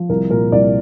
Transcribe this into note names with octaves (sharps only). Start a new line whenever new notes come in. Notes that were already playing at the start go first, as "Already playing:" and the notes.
Already playing: F3
C2 A#4
A#2 A#4
C2 D5